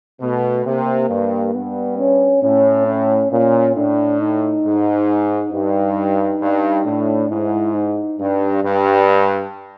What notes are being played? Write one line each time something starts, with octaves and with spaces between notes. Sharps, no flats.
B2 A3
C3 A#3
G2
G2 B3
C#4
A2 C#4
C#4
A#2 C#4
A2 D4
D#4
G#2
G2 D#4
G2
A2 D4
G#2 E4
D#4
G2 D4
G2